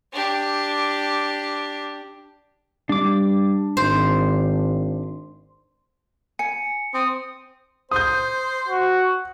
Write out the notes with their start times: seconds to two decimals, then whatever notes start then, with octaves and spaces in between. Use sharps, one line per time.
0.12 D4 G4
2.89 G3 D4 D6
3.77 G#1 C5
6.39 G#5 C#7
6.94 C4 D#6
7.91 C5 D#6 G6
8.69 F#4